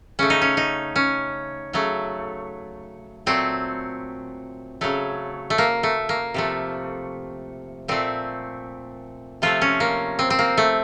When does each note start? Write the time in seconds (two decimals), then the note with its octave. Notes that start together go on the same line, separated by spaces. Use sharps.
0.19 C#3 A3 C#4
0.30 D#4
0.41 C#4
0.57 D#4
0.96 C#4
1.73 C#3 F#3 A3
3.26 A#2 F#3 A3 C4
4.81 C#3 F#3 A3
5.50 A3
5.58 A#3
5.83 A3
6.09 A#3
6.34 C3 F3 A3
7.88 A#2 A3 C4
9.42 C3 F3 A3 F4
9.62 C#4
9.80 A#3
10.19 C4
10.30 C4
10.39 A#3
10.57 A3